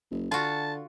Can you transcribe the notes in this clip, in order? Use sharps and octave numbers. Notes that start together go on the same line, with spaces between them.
F#1
D3 F4 F#4 A5